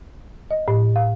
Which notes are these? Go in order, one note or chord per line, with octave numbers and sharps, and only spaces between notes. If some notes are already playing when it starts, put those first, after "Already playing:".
D#5
A2
F5